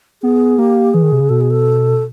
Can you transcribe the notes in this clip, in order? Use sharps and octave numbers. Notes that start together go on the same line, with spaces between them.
B3 G#4
A#3 G4
E3 G#4
D#3
C3
C#3
B2 A4
G#4
A4